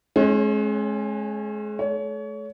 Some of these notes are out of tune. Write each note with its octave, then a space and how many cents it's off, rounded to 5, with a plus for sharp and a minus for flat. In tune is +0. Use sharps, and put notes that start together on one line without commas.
G#3 +30 C#4 -35 C#5 -5
A3 -40 C#5 +30